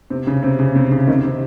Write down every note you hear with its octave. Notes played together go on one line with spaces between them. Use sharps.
C3
C#3
C3
C#3
C3
C#3
C3 D#3
C3